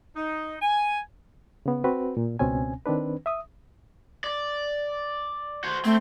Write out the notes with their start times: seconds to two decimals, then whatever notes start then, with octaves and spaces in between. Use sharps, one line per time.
0.16 D#4
0.62 G#5
1.66 C#3 B3
1.84 C4 F#4 B4
2.17 A#2
2.39 C#2 B2 C4 C#4 G#5
2.86 D#3 C4 D4 B4
3.26 E5 D#6
4.24 D5
5.64 F#4 C5
5.85 A3 C4